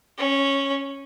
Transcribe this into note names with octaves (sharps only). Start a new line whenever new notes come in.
C#4